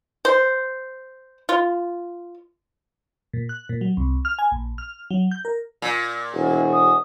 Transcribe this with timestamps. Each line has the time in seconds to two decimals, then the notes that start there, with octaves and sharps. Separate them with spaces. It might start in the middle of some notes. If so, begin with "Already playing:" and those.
0.25 C5
1.49 F4
3.33 A#2
3.49 F#6
3.69 A#2
3.81 F#3
3.97 C2
4.25 F6
4.39 G#5
4.52 A#1
4.78 F6
5.10 F#3
5.31 G6
5.45 A#4
5.82 A#2
6.34 E1 F#4 G#4
6.73 D#6